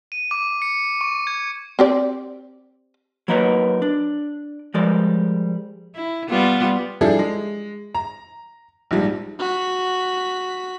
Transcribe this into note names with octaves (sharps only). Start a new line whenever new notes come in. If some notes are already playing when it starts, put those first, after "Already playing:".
D#7
D6
C#7
C#6
G#6
C4 G4 D5
F#3 A#3 D#4 A#4 B4 C#5
D4
F3 G3 G#3 A#4 D5
E4
G3 B3 F4
F3 G3 D4 E4 G#4 A4
G#3
A#5
A#1 G#2 F3 G3
F#4 B6